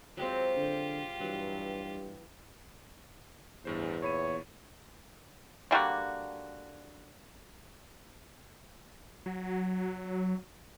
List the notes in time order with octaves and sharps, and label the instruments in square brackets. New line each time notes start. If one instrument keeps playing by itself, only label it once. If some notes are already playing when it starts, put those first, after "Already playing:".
[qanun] F#3 G#3 C4 [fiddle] F4 G4
[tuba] D3
[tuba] G2 [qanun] E3 F#3
[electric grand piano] A1 G2 C5 [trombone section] E2
[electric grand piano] A#2 B5 D#7 [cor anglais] C#5
[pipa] D3 G3 A#3 F#4
[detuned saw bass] F#3